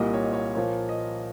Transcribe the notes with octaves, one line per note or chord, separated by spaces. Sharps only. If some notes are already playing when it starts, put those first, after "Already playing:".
Already playing: C2 A#2 G3 A#3 D#5
C#5
D#5
C#5
A#2 F3 A#3 C#5
D#5